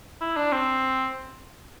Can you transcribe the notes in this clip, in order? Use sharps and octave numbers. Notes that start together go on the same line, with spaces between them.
E4
D4
C4